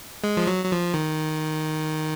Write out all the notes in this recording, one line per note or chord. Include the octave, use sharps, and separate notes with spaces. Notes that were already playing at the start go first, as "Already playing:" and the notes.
G#3
F3
F#3
F#3
F3
D#3